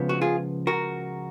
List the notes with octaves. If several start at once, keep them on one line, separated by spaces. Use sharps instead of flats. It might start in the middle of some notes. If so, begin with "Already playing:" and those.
Already playing: C#2 C#3 F3 B3
F#4
F4 G#4
F#4 A#4